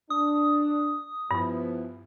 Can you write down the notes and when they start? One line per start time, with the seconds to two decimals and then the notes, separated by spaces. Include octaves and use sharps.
0.10 D4 D#6
1.31 G2 F3 B3 E4